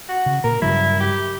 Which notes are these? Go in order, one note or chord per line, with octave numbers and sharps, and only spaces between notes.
F#4
C#3
A#2 A#4
G2 C#3 F#3 E4
G4